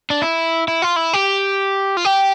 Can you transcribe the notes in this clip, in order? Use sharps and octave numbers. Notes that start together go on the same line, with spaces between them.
D4
E4
E4
F4
E4
G4
F4
G4